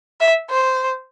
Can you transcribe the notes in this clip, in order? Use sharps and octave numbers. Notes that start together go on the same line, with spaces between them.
E5
C5